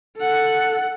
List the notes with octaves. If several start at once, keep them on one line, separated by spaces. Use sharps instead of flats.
A4 F#5